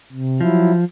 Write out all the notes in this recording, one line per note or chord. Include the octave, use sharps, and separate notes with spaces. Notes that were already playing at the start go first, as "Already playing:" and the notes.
C3
F3 F#3 E4